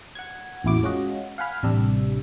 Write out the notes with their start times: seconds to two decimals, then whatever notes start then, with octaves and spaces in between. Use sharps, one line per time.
0.15 F#5 G#6
0.64 A1 E2 A#2 E4 F#4 D6
0.83 G#3 C#4 F4 F#4 D#5
1.38 F5 F#5 G#5 B5 F6
1.63 A1 C3 G3 D4 E6